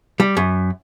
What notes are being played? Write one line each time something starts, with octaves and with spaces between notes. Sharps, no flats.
G3
F#2